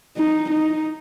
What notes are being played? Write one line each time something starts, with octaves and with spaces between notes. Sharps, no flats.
D#4
D#4